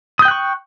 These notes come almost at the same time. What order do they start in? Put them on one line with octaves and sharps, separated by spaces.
D#6 G6 G5 F#6 C#6